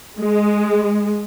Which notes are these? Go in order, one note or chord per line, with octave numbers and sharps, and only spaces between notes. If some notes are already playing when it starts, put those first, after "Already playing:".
G#3